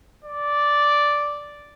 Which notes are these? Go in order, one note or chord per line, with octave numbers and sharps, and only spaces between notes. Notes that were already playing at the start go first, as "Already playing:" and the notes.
D5